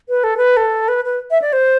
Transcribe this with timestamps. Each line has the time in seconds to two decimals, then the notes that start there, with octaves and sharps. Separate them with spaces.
0.09 B4
0.24 A4
0.37 B4
0.57 A4
0.88 B4
1.05 B4
1.31 E5
1.42 D5
1.53 C5